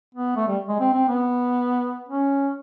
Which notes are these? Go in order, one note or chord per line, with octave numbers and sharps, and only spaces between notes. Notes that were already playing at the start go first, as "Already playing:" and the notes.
B3
A3
G3
G#3
C4
C4
B3
C#4